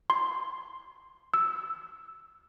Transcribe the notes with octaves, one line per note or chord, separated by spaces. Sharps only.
C6
E6